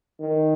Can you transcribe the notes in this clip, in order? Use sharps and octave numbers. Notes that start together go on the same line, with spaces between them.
D#3